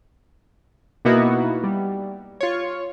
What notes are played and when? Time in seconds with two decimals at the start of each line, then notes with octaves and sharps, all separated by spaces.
1.05 B2 A#3 B3 D#4 E4 F#4
1.64 G3
2.41 F4 C#5